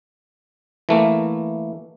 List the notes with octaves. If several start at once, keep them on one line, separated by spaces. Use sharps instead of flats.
E3 A3 A#3